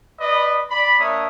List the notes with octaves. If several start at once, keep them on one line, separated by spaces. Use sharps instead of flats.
B4 D5 D#5 B5
D5 B5
A#3 D4 C#5 E5 D#6